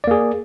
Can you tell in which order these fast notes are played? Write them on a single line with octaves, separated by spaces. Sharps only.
D5 A#3 G#4